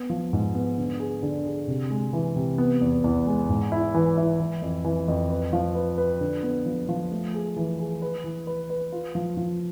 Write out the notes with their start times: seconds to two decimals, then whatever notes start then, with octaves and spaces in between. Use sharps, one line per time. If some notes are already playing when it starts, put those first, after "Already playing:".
Already playing: B3
0.10 F3
0.33 G#2
0.55 B3
0.78 D3
1.00 G#4
1.23 D3
1.46 G#4
1.68 C3
1.90 G#3
2.13 E3
2.36 C3
2.58 B3
2.81 E2
3.04 E2
3.27 G#3
3.49 G#2
3.72 E4
3.94 E3
4.17 E4
4.40 E3
4.62 F2
4.85 E3
5.08 F2
5.30 B4
5.53 F3
5.75 B4
5.98 B4
6.21 D3
6.43 B3
6.66 F3
6.89 F3
7.12 A3
7.34 G#4
7.56 E3
7.79 G#4
8.02 B4
8.24 E3
8.47 B4
8.70 B4
8.92 F4
9.15 F3
9.37 F3